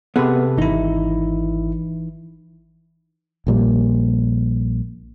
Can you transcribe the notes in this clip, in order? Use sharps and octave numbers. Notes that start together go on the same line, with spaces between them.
C3 B3 G#4 A4 B4
G#1 E3 D#4 E4
A#1 A#2 G3